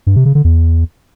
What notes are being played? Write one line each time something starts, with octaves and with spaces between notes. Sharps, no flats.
G2
C3
C#3
D3
E2